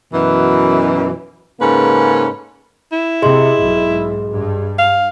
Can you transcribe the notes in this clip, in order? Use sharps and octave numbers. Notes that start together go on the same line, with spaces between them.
F#2 B2 E3
G#2 C#3 A#3 C#4 A4 B4
E4
C3 G#4 D#5 C6
B1 G#2
G2
F5